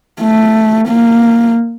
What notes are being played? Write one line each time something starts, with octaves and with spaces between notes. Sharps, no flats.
A3
A#3